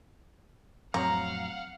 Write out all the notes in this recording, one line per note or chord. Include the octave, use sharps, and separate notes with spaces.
F2 A2 F#3 C4 C#5 F5 F#5 A#5